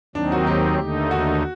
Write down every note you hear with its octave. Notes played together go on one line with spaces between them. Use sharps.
D#2 D#3 F#3 C4 D4 D#4
F#4
G4
D#2 D3 A3 D#4
F#4